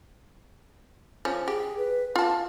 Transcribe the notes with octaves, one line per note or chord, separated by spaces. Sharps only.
F3 C#4
G4 G#4
B4
F4 F5 A5